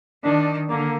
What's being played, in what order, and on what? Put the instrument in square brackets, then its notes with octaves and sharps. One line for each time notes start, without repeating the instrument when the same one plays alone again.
[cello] D#3 [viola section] D4
[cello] D3 [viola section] A#3